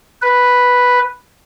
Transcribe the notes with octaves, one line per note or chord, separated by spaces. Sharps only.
B4